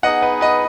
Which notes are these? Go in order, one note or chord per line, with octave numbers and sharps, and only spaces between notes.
B3 D#4 G#4 D#5 F#5
B4 D#5
B4 D#5